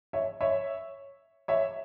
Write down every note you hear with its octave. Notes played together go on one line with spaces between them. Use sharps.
C#5 E5
C#5 E5
C#5 E5